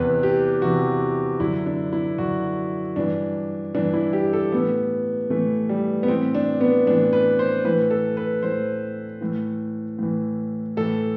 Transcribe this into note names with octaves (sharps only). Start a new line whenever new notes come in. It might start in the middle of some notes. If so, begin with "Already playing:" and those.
Already playing: E2 C3 E3 B4
G4
E2 C3 E3 F#4
F#2 D3 E4
D4
E4
F#2 D3 F#4
G2 E3 D4
G2 E3 D4
E4
G4
A4
A2 E3 B3
A2 E3 A3
G3
B3
A2 E3 C4
D4
B3
A2 E3 D4
B4
C5
A2 E3 B4
A4
B4
A2 E3 C5
A2 E3
A2 E3
A2 E3 A4